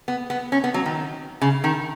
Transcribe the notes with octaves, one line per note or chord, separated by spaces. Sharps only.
B3
B3
C#4
B3
F#3
D#3
C#3
D#3